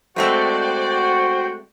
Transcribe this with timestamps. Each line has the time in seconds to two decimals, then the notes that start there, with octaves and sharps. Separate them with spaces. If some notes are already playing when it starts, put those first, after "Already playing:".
0.16 G#3 A3 C4 F#4 C5 D5 G5